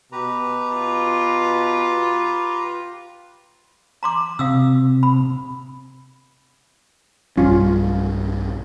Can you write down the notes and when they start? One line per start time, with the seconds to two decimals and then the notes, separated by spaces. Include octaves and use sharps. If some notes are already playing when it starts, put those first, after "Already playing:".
0.12 B2 G4 B4 A#5
0.77 F4
4.03 A#5 C6 D6
4.39 C3 F5 D#6 E6
5.03 B5
7.37 B1 G2 G3 C#4 F4